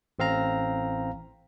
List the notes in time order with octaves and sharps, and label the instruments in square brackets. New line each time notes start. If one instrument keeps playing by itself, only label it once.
[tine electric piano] A1 C4 F5 A#5